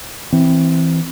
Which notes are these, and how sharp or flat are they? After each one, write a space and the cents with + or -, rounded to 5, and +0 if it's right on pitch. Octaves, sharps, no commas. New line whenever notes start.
E3 +0 C4 +0